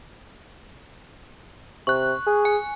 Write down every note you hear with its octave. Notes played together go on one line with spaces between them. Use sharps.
C3 C#6 F#6
G#4
G#5